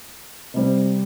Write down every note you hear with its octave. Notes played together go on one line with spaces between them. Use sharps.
C3 G3 C4